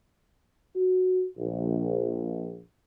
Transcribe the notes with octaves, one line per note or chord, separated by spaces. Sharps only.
F#4
A#1